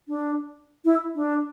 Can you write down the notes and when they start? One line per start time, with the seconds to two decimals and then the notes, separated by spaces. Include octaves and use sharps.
0.08 D4
0.85 E4
1.16 D4